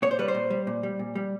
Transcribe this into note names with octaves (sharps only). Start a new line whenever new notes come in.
A#2 C#5
C5
G3 B4
C5
A#2
G3
A#2
G3
A#2
G3